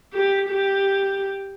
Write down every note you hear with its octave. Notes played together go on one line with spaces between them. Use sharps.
G4
G4